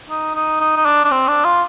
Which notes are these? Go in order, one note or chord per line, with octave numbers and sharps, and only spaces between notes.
D#4
D#4
D#4
D#4
D4
D4
C4
D4
F4